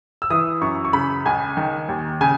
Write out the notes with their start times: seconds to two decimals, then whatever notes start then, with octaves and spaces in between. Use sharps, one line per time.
0.22 E6
0.30 E3 D#6
0.61 F#2 C#6
0.85 C#6
0.93 C#3 B5
1.26 C#2 G#5
1.57 D#3
1.89 D#2
2.21 C#3 G#5